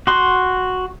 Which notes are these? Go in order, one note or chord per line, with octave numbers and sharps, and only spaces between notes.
F#4 C6